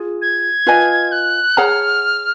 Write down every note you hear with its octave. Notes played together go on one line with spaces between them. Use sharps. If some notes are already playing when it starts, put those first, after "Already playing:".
Already playing: F4 G#4
G#6
F4 B4 D#5 G#5
F#6
G#4 C#5 F#5 A#5 F6